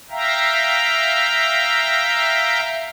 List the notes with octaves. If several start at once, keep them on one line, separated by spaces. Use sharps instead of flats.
E5 F5 G5 A#5